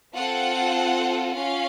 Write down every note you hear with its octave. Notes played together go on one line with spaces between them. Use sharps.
C4 F4 A4 F#5
C#4 F4 F5